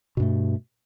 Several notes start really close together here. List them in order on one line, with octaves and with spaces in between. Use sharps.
B2 G2 A3